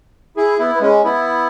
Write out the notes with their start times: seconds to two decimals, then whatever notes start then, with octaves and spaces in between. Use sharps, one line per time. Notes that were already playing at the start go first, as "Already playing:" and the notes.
0.37 E4 G#4
0.59 B3 E4
0.75 B3
0.81 G#3 C#4
1.04 B3 E4